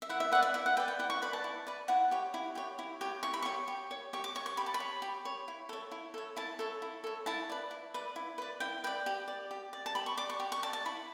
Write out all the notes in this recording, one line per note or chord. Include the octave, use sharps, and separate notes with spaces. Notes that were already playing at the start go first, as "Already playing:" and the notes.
E5
E4 F#5
E5
B4 D5 F#5
E5
E4 E5
F#5
B4 D5 G5
G5
E4 F#5
C#6
B4 D5 B5
A5
E4
B4 D5
E4 F#5
G4 C#5
E4
G4 C#5
E4
G4 C#5
E4 C#6
B5
G4 C#5 C#6
G4
C#5
G4 C#6
D6
C#5 C#6
C#6
G4 B5
A5
B5
C#5
G4
C#5
E4
A4 C#5
E4
A4 C#5
E4 A5
A4 C#5
E4
A4 C#5
E4 A5
B4 D5
E4
B4 D5
E4
B4 D5
E4 G5
B4 D5 G5
G4
D5
G4
D5
A5
G4 B5
C#6
D5 D6
C#6
G4
C#6
D5 A5
A5
E4 B5